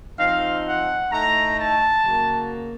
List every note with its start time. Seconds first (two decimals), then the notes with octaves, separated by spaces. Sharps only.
0.19 F3 C4 D#4 F5
0.66 F#5
1.11 A2 A3 D#4 A#5
1.57 A5
2.04 C#3 F#3 A#3